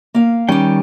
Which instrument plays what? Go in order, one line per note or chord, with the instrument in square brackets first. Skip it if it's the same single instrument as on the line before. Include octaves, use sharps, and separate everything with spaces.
[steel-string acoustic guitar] A#3 F5
[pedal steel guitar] D#3 G3 G5 [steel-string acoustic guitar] C#4 G4